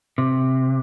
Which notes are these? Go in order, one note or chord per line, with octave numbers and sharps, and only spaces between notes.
C3